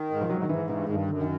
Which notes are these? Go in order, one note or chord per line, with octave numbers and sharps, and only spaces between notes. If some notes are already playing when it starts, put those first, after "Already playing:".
Already playing: D#3
G#2
F3
G#2 F#3
D#3
G#2 E3
G2 E3
G2 D#3
F#2 D3
D#3